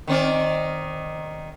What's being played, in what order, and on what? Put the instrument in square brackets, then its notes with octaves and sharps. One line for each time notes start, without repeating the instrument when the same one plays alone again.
[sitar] D#3 C4 D5